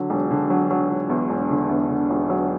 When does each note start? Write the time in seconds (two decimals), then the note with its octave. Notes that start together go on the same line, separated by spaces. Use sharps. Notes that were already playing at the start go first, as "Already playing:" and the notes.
Already playing: D3 F#3
0.10 E1
0.31 D3
0.50 F#3
0.71 F#3
0.90 E1
1.10 E2
1.29 E1
1.50 D3
1.69 E2
1.89 D3
2.10 E1
2.30 F#3